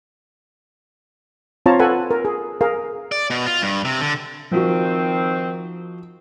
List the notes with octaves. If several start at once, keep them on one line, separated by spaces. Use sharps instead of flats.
C4 F4 C#5 A5 A#5
A4 B4 F#5 G#5 B5
A#4
G#4
G#4 A#4 F5
D5
B2
F4
G2
C3
D3
D#3 F3 C4 F#4